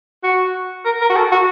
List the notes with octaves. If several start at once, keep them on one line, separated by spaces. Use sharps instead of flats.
F#4
A#4
A#4
F#4
A4
F#4